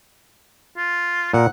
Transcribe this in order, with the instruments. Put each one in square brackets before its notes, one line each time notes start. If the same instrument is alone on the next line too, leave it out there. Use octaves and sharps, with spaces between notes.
[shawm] F4
[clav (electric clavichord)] A#2 A#4 [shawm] F#5